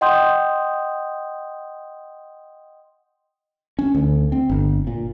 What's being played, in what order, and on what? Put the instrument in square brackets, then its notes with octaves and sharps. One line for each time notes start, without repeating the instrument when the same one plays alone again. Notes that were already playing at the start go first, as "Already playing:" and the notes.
[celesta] D#5 F#5 G5 C6 D#6 G6
[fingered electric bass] C#4
D2
C4
G1
A#2